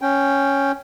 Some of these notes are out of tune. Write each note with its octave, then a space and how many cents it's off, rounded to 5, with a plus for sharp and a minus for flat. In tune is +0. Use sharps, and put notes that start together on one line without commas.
C#4 +0 G5 +0